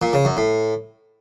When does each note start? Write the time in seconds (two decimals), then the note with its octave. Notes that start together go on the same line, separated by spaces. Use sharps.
0.02 A#2
0.13 C#3
0.25 F#2
0.37 A2